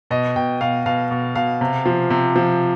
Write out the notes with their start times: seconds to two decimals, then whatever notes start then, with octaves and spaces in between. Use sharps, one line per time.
0.10 B2 D#5
0.36 B2 G5
0.61 B2 F5
0.86 B2 F5
1.11 B2
1.35 B2 F5
1.61 C3
1.86 F3
2.10 C3
2.36 F3